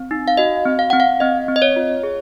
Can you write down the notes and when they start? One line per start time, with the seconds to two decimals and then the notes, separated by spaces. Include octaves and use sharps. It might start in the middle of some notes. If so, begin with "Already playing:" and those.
Already playing: C4
0.11 D#4
0.28 F5
0.37 F#4 D#5
0.65 C4
0.79 F5
0.90 C4 F#5
1.00 F5
1.20 C4 D#5
1.48 C4
1.56 D#5
1.62 C#5
1.76 F4
2.03 G#4